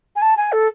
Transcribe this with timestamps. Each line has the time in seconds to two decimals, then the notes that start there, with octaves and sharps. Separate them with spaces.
0.16 G#5
0.22 A5
0.37 G#5
0.52 A4